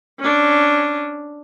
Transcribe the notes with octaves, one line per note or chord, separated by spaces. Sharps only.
C#4 D4